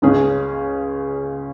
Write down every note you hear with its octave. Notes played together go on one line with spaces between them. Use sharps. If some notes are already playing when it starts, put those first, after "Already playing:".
C#2 C#3 G#3 C#4 G#4